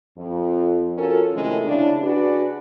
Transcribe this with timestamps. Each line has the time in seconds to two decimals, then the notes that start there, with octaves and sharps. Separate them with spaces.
0.17 F2
0.97 C#4 F4 F#4 A4 A#4
1.33 F2 A2 C3 D#3 G#3 C#4
1.65 C#3 D4 E4
2.03 D4 F#4 G#4 B4 D5